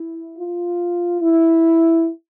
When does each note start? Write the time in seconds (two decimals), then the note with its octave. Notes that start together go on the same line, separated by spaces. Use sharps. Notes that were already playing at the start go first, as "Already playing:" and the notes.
Already playing: E4
0.38 F4
1.22 E4